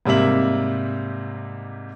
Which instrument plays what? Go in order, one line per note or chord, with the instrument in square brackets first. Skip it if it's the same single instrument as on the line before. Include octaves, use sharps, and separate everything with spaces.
[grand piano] G#2 C3 G3 A#3 E5 F#7